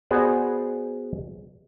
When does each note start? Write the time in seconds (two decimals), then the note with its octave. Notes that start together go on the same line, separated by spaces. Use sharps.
0.11 B3 F#4 G#4 C5 D5